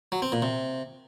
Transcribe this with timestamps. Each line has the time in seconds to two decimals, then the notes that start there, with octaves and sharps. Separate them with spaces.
0.12 F#3
0.22 C4
0.32 A#2
0.42 C3